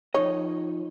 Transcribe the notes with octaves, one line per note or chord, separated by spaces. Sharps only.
F3 D#4 C#5 D#5